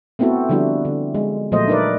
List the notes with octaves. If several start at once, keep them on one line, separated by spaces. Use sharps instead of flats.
A3 B3 C4 E4 F#4 A4
D3 F3 G3 D4 E4 F#4
D3
G#3
A#2 F3 F#3 A3 C5 D#5
D4 D#4 A#4 B4 D5